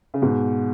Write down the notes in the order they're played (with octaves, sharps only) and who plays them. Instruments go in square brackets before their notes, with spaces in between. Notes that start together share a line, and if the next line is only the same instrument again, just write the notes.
[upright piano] C#3
G#2 B2